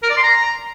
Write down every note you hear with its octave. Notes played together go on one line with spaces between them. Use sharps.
A#4
D5
C6
A#5